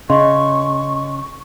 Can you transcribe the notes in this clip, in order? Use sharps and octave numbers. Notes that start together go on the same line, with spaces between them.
C#3 D#5 C6 C#6